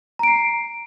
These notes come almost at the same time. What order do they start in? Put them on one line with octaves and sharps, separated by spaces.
A#5 D7 C7